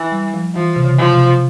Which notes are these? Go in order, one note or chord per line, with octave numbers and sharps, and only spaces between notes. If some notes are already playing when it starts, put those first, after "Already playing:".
Already playing: E3
G3
F3
E3 F3
C3
C#3
F3
C3